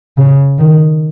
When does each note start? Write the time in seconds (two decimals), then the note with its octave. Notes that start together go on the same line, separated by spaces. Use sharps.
0.18 C#3
0.59 D#3